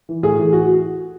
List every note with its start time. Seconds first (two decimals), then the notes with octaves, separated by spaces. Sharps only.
0.09 E3
0.23 A2 G#4
0.38 E3
0.53 F#4